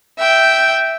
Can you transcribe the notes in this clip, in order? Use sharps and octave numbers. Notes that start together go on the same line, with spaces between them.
E5 G5